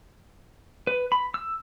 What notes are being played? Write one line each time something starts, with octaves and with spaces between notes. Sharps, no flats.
B4
B5
E6